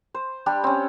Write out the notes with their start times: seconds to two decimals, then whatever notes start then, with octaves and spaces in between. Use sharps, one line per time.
0.14 C5
0.46 G3 D4 G4
0.64 C4 C#4